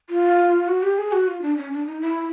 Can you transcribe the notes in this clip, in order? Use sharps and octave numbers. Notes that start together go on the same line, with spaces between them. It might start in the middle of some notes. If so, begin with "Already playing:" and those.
F4
F#4
G4
G#4
F#4
F4
D4
C#4
D4
D#4
E4